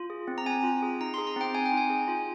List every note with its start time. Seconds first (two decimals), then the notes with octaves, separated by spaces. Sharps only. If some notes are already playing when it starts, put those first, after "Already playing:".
Already playing: F4
0.10 G#4
0.28 C4
0.38 A#5
0.46 C4 G#5
0.63 F4
0.82 G#4
1.01 D#4 A#5
1.14 C6
1.18 G#4
1.27 A#5
1.36 C4 G5
1.54 C4 G#5
1.66 G5
1.73 D#4 G#5
1.90 G#4
2.08 F4